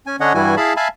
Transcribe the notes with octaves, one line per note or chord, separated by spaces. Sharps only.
C#4 G#5
D3 C#4 D4 C#5 D#5 F#5
G2 E3 G3 E4 F#4 G#5
E4 G#4 F5 A5 B5
E5 F5 G#5 A5 B5